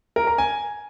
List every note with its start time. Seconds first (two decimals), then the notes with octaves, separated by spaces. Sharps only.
0.16 A#4
0.27 A#5
0.38 G#5